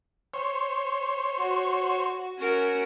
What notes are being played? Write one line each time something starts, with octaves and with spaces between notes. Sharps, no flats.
C5 C#5
F#4
C#4 F#4 A#4